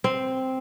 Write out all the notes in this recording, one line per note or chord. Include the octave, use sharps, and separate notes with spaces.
C4